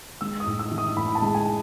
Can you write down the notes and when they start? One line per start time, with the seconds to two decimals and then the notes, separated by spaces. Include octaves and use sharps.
0.21 G#3 E6
0.40 D#6
0.46 A2
0.59 E6
0.71 E3
0.78 D#6
0.97 A2 B5
1.15 A5
1.22 G#3
1.35 G#5